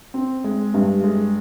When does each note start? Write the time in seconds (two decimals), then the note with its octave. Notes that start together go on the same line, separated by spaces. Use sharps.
0.14 C4
0.44 G#3
0.74 G2
1.04 G#3